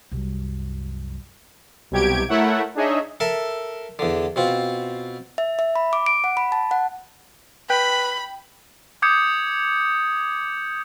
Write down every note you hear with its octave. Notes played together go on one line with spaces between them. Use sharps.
C2 F#2
C2 B2 F#3 G4 G#6 D7
A3 E4 A#4 C#5 E5 F#5
D4 D#4 G#4 C#5 D#5 E5
A4 A#4 E5
E2 D3
B2 C4 F4
E5
E5
B5
D6
D7
F#5
B5
A5
F#5
B4 G5 B5
D6 D#6 G6 G#6 C#7